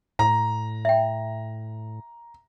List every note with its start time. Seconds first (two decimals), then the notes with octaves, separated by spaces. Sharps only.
0.19 A2 A#5
0.85 E5 G5